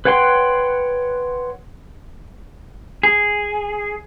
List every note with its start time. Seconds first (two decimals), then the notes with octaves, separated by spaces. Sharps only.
0.05 B4 C#5 F#5 G5 C6
3.03 G#4